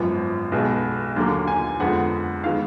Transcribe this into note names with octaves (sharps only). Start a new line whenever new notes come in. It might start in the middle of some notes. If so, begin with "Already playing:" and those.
Already playing: G#1 F#2 F3 B3
B1 B2 G#3 B3
D#2 D3 F#3 A#3
G#5
F2 D3 G#3 B3 F#5
D#3 G#3 B3 F5